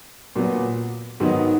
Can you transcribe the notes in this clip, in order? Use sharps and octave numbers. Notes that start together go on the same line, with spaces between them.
A#2 F#3 B3
G#2 D#3 F#3 B3 D#4